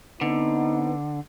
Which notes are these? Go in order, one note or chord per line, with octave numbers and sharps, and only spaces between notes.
D3 B3 C4 D#4